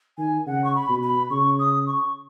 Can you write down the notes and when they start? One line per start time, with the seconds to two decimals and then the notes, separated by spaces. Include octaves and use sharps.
0.18 D#3 G#5
0.46 C#3 F#5
0.64 C#6
0.75 B5
0.89 B2
1.03 B5
1.31 C#3 C#6
1.59 D#6
1.87 C#6